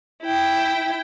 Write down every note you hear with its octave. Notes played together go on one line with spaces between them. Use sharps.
E4 G5